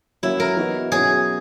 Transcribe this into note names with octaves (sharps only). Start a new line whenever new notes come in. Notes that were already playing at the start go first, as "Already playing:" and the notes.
F#3 A#3 C#4 E4 F#4
A#4
E3 B3 D#4 F#4
B2 F#3 C#4 F#4 G#4